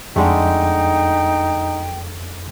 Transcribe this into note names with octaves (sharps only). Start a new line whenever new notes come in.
F2 D3 G#3 A3 D#4 G5